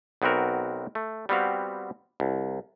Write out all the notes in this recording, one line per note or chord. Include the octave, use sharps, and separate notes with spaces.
B1 B3 C4 F#4 A#4
A3
G3 B3 C4 F#4 F5
C2